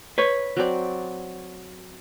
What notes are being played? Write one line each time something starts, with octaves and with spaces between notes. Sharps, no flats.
B4 C#5
F#3 C4 D5